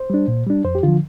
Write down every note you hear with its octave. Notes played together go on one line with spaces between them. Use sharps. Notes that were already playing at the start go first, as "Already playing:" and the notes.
Already playing: C5
G3 D4
A#2
G3 D4
F2 C5
G4
D3 F3 F4